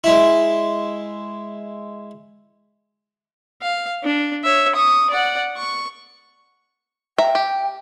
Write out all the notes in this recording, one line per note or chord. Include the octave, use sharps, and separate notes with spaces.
G#3 E4
F5
D4
C#5 E5
C#6 D#6
D5 F#5
C#6
E5 G5 A#5
G4